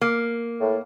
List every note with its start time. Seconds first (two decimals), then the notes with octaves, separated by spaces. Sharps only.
0.01 A#3
0.60 A2